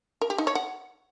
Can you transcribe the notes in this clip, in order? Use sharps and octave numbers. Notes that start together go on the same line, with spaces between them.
A#4
G4
D#4
C#5
F#5